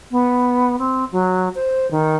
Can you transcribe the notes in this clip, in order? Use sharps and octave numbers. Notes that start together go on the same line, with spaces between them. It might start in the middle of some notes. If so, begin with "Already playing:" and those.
B3
C4
F#3
C5
D#3